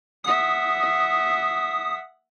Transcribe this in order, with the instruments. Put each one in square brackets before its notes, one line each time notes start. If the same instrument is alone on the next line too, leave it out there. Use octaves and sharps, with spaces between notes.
[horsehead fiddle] E5 F#5 [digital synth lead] D#6